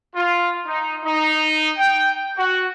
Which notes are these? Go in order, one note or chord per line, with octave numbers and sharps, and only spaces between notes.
F4
D#4
D#4
G5
F#4